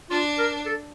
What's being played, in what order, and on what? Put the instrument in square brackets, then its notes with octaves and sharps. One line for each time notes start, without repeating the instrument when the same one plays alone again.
[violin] D4 [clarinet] F4
[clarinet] A#4
A4